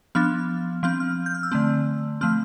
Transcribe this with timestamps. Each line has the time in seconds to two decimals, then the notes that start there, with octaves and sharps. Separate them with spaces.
0.15 F3 B3 D4 F6
0.83 F3 C4 F6
1.00 F6
1.26 G6
1.35 F6
1.43 E6
1.52 D3 A3 C4
2.21 F3 A3 C4 F6